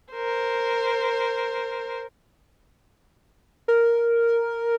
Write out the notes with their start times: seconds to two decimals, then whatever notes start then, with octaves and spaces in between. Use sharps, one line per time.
0.13 A#4 C5
3.68 A#4